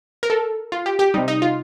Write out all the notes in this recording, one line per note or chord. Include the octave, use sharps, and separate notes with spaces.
A#4
A4
F4
G4
G4
C3 G3 D#4
D#4
F4